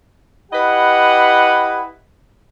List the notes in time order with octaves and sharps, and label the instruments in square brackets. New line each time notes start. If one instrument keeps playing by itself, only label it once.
[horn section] E4 G4 B4 D#5 F#5